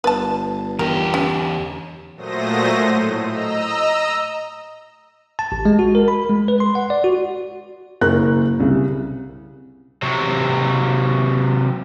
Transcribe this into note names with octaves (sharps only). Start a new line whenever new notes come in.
G1 B4 A5
E2 G4 A#4
C#4
A#2 F#3 A3 C5 D#6 A#6
A2
D#5 A#5 E6
A5
A1
G#3
F#4
A#4
B5
G#3
B4
C6
F#5
D5
F#4
F#1 A#4 A#5 F#6
C2 C#3
C3 F#3